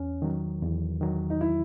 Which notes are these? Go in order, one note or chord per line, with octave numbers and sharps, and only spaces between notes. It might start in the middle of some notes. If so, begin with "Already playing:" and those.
Already playing: E2 C#4
D#3 F#3
E2
D#3 F#3
D#4
E4